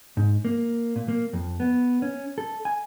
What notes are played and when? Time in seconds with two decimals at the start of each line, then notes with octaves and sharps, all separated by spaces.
0.17 G#2
0.45 A#3
0.96 A#2
1.08 A#3
1.33 F2
1.60 B3
2.02 C#4
2.38 A4
2.65 G#5